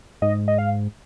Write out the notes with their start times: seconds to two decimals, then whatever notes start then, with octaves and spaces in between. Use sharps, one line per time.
0.22 G#2 D#5
0.48 D#5
0.58 F5